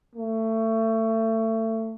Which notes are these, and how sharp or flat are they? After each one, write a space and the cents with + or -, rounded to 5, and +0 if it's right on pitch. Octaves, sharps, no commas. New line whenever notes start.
A3 +25